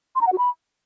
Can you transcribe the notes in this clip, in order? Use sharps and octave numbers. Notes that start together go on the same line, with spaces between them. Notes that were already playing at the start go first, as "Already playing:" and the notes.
C6
A#5
F#5
F#4
B5